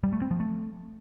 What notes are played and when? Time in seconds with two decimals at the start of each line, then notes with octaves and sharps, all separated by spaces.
0.03 G3
0.13 A3
0.22 C4
0.31 F3
0.40 A3